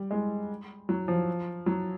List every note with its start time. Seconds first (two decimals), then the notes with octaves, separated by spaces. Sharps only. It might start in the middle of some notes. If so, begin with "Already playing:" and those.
Already playing: G3
0.11 G#3
0.89 F#3
1.08 F3
1.66 F#3